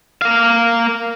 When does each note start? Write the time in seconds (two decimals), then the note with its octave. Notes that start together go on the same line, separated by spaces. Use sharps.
0.22 A#3 F5